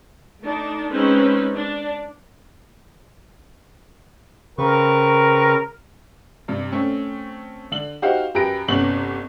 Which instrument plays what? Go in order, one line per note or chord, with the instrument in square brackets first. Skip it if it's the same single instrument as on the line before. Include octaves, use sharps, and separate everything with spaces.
[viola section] A3 D4 D#4
G#3 C4 C#4 D#4 B4 C5
D4
[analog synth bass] C#3 [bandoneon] C4 B4 C#6 [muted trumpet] A#4
[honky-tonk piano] G2 C3
A3 C4 C#4
D3 F#7
D#4 F#4 G4 C5 F5 F#5
F#2 G4 B4 A#6 D7
G1 C3 B3 C#4 F#7